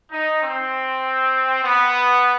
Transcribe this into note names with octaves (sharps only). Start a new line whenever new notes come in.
D#4
C4
B3